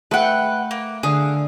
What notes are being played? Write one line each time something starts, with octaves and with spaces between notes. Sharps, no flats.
A3 B4 F#5 G5
A#3
D3 G#4 F5